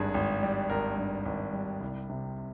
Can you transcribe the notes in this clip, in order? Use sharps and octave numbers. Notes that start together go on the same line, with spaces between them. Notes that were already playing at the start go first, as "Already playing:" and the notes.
Already playing: G#1 G2 G#4
G#1
G3
G#1 A#4
G2
G#1
G3
C2
C3